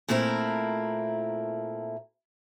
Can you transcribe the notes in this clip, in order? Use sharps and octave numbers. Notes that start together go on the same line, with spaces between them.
A#2 A3 C4 E4 A#4